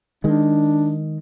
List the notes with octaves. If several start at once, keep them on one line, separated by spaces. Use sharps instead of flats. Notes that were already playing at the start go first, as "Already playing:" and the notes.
D#3 G#3 D4